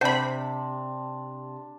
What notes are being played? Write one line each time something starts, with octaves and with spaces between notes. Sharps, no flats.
C3 D4 C5 B5